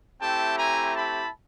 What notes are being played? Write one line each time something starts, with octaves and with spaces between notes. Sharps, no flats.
A3 C4 E4 G4 G5 A5
G#5 A#5
A5 B5